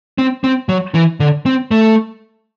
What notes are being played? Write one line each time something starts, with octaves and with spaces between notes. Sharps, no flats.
C4
C4
F#3
E3
D3
C4
A3